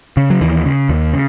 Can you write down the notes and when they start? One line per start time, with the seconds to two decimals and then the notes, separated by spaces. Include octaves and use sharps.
0.17 C#3
0.30 F#3
0.41 D#2 E3
0.65 C#3
0.89 D#2
1.13 C#3